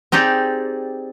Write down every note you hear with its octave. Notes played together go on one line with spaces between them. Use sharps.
C4 D#4 G4 G#4 D5